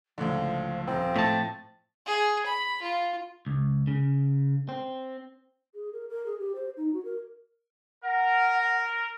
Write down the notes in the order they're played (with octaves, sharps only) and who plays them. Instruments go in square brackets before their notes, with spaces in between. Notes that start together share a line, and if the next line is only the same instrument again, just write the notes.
[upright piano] C#2 A2 D3 [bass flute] F3
[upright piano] D#1 [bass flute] F3 [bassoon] C4
[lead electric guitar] A2 A5 [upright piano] A3
[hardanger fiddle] G#4
B5
F4
[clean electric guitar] C#2
C#3
C4
[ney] G#4
A#4
A#4
G#4
G4
C5
D#4
F#4
A#4
[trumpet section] A#4 [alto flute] F#5